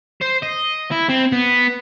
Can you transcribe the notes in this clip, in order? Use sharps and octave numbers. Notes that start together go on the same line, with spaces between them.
C5
D#5
E4
C4
B3